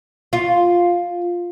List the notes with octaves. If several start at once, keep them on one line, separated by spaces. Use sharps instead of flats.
F4